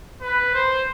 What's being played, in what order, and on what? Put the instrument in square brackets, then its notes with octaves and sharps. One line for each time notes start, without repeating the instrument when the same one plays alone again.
[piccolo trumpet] B4
C5